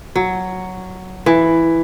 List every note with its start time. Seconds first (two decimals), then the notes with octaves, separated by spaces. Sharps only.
0.16 F#3
1.26 E3